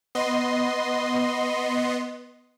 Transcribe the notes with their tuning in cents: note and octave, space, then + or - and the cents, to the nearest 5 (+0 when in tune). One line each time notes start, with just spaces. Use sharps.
B3 +0 D#5 +0 C6 +0